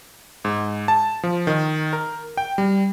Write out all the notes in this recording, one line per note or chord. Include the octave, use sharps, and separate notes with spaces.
G#2
A5
F3
D#3
A#4
G5
G3